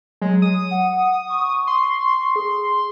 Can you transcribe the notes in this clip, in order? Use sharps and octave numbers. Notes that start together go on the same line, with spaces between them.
F#3 G#3
D#6
F#5
C#6
C6
G#4